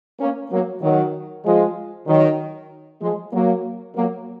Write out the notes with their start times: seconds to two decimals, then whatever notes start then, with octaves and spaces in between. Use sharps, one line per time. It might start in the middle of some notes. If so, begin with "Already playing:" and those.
0.19 A#3 C#4
0.50 F#3 A#3
0.82 D#3 F#3
1.45 F3 G#3
2.07 D#3 F#3
3.01 F3 G#3
3.32 F#3 A#3
3.95 F#3 A#3